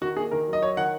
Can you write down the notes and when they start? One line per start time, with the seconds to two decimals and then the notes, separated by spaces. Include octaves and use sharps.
0.01 D#3 F#4
0.17 A#3 G#4
0.31 D#3 A#4
0.48 F#3
0.53 D#5
0.62 F#3 C#5
0.77 D#3 F#5